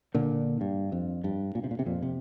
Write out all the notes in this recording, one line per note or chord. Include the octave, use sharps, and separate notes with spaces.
A#2 D3
G2
F2
G2
A#2
C3
A#2
C3
F2 A#2
C3